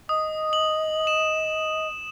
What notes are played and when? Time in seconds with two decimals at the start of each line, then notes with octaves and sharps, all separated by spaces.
0.09 D#5 D#6
0.53 F#7
1.07 E7